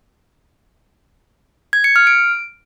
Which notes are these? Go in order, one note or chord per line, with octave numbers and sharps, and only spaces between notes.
G#6
C#7
F6
D7